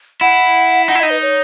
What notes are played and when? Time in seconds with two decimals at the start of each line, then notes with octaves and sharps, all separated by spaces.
0.21 E4 F#5
0.88 D#4 F#5
0.95 E4
1.00 D#4 D#5
1.10 B4
1.22 C#5